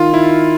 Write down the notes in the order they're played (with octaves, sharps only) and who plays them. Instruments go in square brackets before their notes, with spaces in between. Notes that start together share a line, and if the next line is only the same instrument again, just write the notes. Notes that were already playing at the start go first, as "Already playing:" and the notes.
Already playing: [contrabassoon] D#3 [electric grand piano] F4
[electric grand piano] E4